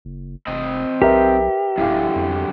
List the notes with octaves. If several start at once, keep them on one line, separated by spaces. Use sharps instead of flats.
F#1
F1 C4 D#5
B1 G4 A#4 B4 E5
D1 F#2 D3 E4 F5
F2